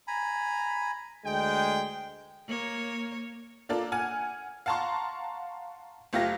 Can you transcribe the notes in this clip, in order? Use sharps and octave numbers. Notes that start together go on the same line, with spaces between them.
G#5 A#5 B5
D2 G#3 G5
A#3 C#5
A#3 D4 F4 A4
F#5 G#5 F6 G#6
F5 F#5 A5 A#5 C6 C#6
F#1 A3 F4 G4 F5 A#6